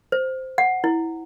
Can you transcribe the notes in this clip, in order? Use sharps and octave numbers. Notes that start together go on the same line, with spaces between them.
C5
F#5
E4